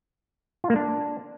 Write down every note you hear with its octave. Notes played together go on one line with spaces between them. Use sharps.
F4
A#3
D4